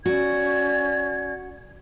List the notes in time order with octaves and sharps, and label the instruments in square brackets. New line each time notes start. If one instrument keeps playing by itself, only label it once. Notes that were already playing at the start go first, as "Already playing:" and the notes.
[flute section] C#4 D5 G#6 [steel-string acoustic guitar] F#4